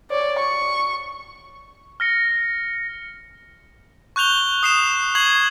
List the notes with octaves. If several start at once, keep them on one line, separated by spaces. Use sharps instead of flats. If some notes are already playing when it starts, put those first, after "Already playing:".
C#5 D5
C#6
F6 A#6 C#7
C#6 F#6 G6 F7 G7
D#6 C7 E7
C#6 G#6 C7 F#7